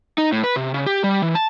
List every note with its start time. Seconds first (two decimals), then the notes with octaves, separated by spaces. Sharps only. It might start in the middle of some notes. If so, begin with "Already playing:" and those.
0.18 D#4
0.32 A2
0.44 B4
0.56 C3
0.74 C#3
0.86 G4
1.04 G3
1.22 E3
1.35 A5